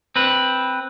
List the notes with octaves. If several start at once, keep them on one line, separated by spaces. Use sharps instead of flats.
C4 B4